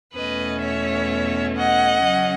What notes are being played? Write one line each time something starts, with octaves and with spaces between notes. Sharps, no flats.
E2 B2 A3 C#4 B4 D#5
C#5 E5
D#5 F#5
C#3 F#3 C#4